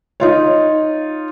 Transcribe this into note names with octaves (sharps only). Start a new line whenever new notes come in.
D#4 F4 C#5